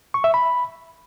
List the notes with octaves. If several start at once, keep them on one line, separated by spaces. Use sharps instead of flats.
C#6
E5
B5